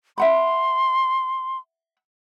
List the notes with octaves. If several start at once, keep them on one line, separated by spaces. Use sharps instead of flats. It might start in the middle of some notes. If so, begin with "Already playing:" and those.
E5 F#5 B5 C6